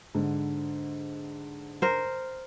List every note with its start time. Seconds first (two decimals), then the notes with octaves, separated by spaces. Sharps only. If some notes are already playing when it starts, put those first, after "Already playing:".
0.15 G#2 D3
1.82 A#4 C5